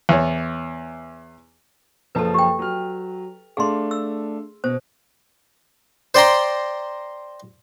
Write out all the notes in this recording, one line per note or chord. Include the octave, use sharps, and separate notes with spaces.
E2 C#5
F#1 F3 A4 B4 A5
G4 G5
F#3 F6
A3 D4 G#4 F5 C6
E6
B2 C5
C5 D5 G5 A#5 C6